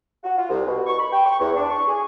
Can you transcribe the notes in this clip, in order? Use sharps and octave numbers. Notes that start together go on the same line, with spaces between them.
F#4
F4
C2
B2
C#6
B5
G5
C#6
E2
D4
C#6
G#4